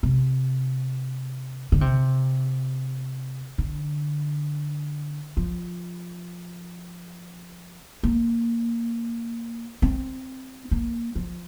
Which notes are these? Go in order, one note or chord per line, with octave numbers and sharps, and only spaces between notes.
C3
D3
C3
D3
F3
A#3
C4
A#3
F3